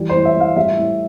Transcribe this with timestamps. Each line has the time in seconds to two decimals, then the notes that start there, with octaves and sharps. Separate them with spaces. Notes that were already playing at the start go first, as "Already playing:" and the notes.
Already playing: E3 G3
0.09 C5
0.15 A2
0.25 E5
0.35 A2
0.40 F5
0.56 G3 E5
0.77 A2